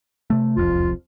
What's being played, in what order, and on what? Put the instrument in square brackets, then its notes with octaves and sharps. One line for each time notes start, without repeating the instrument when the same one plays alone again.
[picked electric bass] C3 A3
[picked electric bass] E1 C2 F2 [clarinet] F4